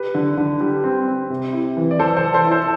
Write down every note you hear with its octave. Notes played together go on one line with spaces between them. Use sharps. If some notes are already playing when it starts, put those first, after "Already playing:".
Already playing: G4 B4
D3
D3
G3
C4
C4
C3
E4
E3
D5
E3 A4 C5
A4 C5
E3
A4 C5
E4
A4 C5